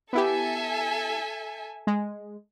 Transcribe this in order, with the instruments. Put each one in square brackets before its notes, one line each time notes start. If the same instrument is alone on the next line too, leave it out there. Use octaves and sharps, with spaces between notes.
[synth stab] B3 E4 G4 [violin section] A4 E5 G#5
[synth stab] G#3